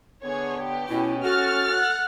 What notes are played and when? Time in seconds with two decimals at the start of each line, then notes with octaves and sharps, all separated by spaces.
0.24 D3 B3 G#4 C#5
0.60 G4
0.89 B2 C#4 E4
1.23 F#4 A4 F6 A6
1.72 F#5